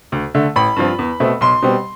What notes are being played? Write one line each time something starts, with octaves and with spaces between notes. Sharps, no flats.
D2
D3 A3
A1 B5
G2 F3 C4 F4
E2
B2 A3 C4
B1 C6
B2 G3 C4